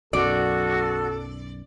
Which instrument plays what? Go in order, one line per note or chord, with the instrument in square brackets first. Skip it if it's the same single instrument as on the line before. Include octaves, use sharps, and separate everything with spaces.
[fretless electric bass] B1 F#2 [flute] F#4 [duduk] A4 [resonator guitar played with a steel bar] D5